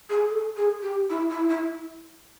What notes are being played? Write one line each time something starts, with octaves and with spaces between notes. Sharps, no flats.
G#4
A4
G#4
G4
E4
E4
E4